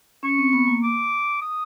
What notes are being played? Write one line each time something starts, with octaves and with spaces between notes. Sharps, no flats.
C#4 C#6
C4
B3
A#3
D6
D#6